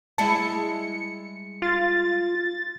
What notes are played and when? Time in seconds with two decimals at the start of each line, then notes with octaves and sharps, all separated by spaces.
0.18 G3 G#3 E4 A5 C#7
1.62 F4 A6